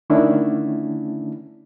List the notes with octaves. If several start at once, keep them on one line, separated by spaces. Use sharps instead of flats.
D3 D#3 A3 C#4 D4 E4